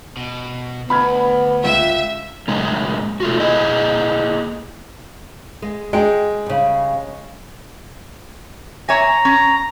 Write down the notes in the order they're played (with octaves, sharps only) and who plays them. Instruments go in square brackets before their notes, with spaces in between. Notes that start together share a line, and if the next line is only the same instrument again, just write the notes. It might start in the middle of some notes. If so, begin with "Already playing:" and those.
[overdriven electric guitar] B2
[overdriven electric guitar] D2 [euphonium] B3 [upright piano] B5 F6 G#6
[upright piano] C#2 F4 [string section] E5
[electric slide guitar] A2 C#3 G#3 A#3
A3 F4 F#4
A#3 E4 G#4 D#5
[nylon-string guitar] G#3
[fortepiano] G#3 [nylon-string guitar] G5
[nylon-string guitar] C#3 G3
[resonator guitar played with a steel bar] C#5 E5 G#5 [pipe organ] A#5
[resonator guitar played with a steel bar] C#4